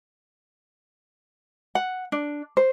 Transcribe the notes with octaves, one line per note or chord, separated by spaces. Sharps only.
F#5
D4
C5